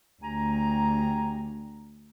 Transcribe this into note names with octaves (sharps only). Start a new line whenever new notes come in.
D2 G4 G#5 A#5